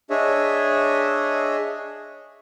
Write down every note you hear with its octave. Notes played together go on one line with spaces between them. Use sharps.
D4 G#4 C#5 D#5 E5